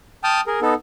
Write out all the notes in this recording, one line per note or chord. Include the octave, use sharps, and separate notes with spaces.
G5 A5 D#6 F6
G#4 A#4
B3 D#4 A4